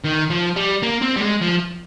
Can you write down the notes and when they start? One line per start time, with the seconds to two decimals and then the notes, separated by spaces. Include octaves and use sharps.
0.04 D#3
0.30 F3
0.56 G3
0.82 A#3
1.02 C4
1.17 G3
1.21 G#3
1.41 F3